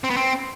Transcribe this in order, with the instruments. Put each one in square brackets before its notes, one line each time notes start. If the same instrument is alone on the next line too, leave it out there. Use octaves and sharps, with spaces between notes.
[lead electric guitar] C4
B3
C4